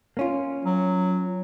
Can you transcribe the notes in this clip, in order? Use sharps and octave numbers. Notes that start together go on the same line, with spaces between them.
A#3 C#4 F4
F#3